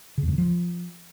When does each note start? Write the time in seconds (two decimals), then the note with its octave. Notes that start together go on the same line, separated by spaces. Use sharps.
0.18 C#3
0.23 E2
0.28 G2
0.33 D3
0.38 F3